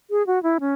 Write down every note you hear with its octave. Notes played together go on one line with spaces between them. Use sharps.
G#4
F#4
E4
C#4